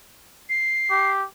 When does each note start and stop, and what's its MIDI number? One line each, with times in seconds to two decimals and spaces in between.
0.50 1.10 96
0.91 1.26 67